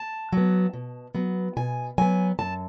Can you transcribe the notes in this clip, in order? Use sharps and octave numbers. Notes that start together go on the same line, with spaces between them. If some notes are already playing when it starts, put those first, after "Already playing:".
Already playing: A5
F#3 B3
B2
F#3 B3
B2 G#5
F#3 B3 G#5
F#2 A5